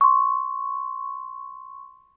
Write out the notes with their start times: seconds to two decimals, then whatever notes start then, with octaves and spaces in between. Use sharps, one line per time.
0.01 C6 C#6